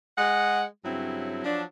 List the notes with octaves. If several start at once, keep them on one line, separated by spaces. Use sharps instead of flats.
G#3 F#5
G2 C#3 F#3 C4 E4
F3 F#3 D4